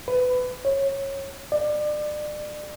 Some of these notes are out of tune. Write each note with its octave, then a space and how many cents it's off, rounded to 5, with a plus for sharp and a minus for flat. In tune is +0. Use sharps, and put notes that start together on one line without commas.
B4 +25
C#5 -15
D5 +30